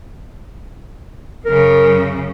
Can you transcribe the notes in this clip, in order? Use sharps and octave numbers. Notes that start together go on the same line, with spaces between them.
F#2 C#3 A#4